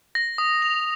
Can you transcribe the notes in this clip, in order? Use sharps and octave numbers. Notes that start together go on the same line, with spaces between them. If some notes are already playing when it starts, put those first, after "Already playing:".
A#6
D#6
F7